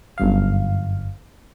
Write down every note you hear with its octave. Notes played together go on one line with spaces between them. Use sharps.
G1 F#2 F5